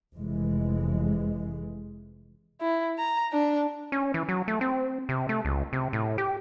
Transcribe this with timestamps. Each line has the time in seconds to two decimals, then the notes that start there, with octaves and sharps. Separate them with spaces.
0.15 F1 E3 G#3
2.61 E4
2.98 A#5
3.33 D4
3.92 C#4
4.14 E3
4.29 F#3
4.48 A3
4.61 C4
5.09 C3
5.29 A3
5.45 C#2
5.73 C3
5.93 A2
6.18 G4